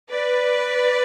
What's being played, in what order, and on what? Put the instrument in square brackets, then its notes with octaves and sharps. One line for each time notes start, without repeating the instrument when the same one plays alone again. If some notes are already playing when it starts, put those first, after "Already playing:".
[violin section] B4 D5